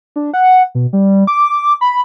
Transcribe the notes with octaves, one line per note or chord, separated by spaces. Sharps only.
D4
F#5
B2
G3
D6
B5